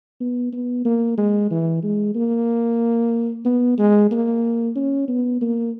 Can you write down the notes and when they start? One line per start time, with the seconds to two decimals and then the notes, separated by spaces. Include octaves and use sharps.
0.20 B3
0.53 B3
0.85 A#3
1.18 G#3
1.51 E3
1.83 G#3
2.15 A#3
3.45 B3
3.78 G#3
4.11 A#3
4.76 C#4
5.08 B3
5.41 A#3